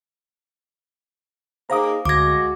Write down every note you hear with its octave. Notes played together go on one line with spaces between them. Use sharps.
A#3 D#4 G#4 C5 F5 A#5 D6 D#6
D2 G#3 F#4 D6 G#6 A#6